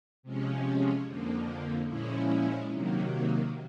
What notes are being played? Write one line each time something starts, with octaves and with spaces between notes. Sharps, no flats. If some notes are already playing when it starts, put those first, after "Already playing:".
C3 F3 G#3 C#4
F2 D3 F3 A#3
A#2 F3 G#3 C#4 E4
C3 D#3 F#3 A#3